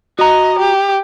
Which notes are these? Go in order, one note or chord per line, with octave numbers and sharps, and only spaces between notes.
F#4 D#5 A#5
G4